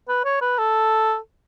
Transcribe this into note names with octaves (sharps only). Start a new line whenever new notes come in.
B4
C#5
B4
A4